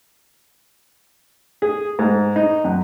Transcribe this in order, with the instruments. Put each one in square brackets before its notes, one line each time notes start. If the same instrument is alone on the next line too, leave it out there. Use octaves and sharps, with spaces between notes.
[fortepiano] G#4
G#2
D#4
F#2